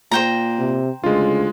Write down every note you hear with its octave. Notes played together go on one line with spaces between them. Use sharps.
A#2 C5 G5 A#5
C3
D2 C#3 G#3 F4